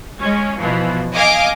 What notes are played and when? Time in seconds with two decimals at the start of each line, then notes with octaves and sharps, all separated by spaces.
0.21 G#3 C#4
0.59 B2 E3 F3
1.14 D#5 F5 G#5 D6